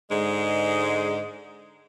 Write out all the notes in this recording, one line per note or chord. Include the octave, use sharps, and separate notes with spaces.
G#2 D3 G#3